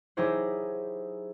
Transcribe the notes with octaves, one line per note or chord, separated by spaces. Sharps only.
F#3 D#4 E4 G4 G#4 C5